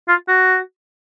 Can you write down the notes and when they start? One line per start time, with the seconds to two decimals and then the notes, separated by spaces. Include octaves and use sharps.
0.08 F4
0.28 F#4